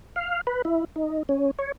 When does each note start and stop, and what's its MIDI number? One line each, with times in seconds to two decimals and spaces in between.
0.16 0.41 77
0.47 0.62 71
0.65 0.84 64
0.96 1.23 63
1.29 1.51 61
1.59 1.72 73